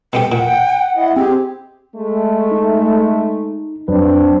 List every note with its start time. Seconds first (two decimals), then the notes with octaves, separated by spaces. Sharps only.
0.13 B2 B3 G4 G5 C#7
0.32 A#2 F#5
0.96 E4 D#5
1.16 C4 G4 G#4
1.96 G#3 A3
2.51 D#4
3.88 F2 F#3 C4 D4 B4